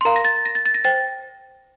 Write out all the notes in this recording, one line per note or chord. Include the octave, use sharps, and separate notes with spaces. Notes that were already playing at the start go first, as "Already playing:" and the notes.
C6
A#4 F5 A#5
A#6
A6
A#6
A6
A6
A#6
C5 G5 A6